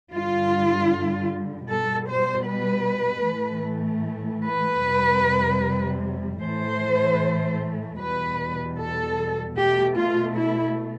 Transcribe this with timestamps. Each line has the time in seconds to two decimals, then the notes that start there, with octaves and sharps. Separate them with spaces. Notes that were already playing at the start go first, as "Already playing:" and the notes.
0.12 G2 D3 G3 F4
1.69 B2 G3 A4
2.09 C5
2.48 B4
3.27 A2 E3 A3
4.45 B4
4.84 F2 C3 G3
6.42 A2 E3 A3 C5
7.99 E2 B2 G3 B4
8.79 A4
9.58 B2 A3 G4
9.97 F4
10.37 E4